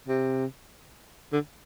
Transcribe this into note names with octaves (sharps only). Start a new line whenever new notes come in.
C3
D3